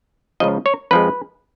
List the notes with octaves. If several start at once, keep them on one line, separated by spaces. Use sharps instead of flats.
C#2 C#3 F3 D#5
C#5
F2 F3 G#3 B4